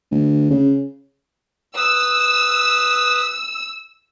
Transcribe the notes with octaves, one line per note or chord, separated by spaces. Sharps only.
D2
C#3
B4 D#6 E6